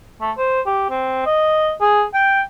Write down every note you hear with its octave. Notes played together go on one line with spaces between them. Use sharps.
A3
C5
G4
C4
D#5
G#4
G5